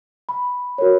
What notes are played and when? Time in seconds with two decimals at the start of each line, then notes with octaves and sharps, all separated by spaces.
0.29 B5
0.78 F#4 A#4 C#5